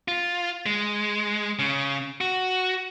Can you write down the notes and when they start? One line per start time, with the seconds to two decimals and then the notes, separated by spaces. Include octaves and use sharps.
0.08 F4
0.66 G#3
1.59 C#3
2.21 F#4